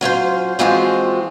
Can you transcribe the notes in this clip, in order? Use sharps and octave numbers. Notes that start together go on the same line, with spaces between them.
F#3 C#4 F4 C5
E3 F3 G#3 C4 F4 F#4